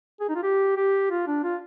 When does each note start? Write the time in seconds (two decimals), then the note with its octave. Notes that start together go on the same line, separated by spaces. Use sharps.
0.20 G#4
0.29 D#4
0.35 F4
0.43 G4
0.77 G4
1.11 F4
1.27 D4
1.44 F4